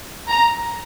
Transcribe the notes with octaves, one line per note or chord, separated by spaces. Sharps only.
A#5